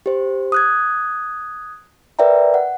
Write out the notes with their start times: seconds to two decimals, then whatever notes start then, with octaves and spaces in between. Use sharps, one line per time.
0.06 G4 C5
0.52 D#6 F#6 G#6
2.19 A#4 B4 D5 E5 G5 A#5
2.54 F#5